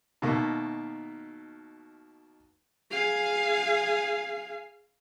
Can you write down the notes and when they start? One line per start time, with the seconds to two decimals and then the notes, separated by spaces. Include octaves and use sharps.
0.22 B2 D#3 A3 A#3
2.91 G#4 F5